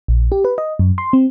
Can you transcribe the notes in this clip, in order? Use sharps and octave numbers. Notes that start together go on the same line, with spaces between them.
A#1
G4
B4
D#5
F#2
C6
C4